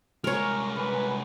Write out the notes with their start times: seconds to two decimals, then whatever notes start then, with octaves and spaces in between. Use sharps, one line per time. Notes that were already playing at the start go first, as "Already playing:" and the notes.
0.24 C2 G#3 A#4 C#5
0.77 B4